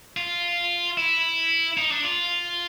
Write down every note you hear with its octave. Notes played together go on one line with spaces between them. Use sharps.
F4
E4
D#4
D4
F4